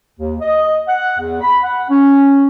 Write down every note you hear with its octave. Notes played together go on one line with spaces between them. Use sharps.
D#2
D#5
F#5
E2
B5
F#5
C#4